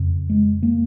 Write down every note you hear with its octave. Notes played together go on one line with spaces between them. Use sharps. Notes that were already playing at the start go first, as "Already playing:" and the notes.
Already playing: F2 C#3
G#3
A#3